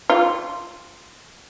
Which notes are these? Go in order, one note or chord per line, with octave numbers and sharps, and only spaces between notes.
F4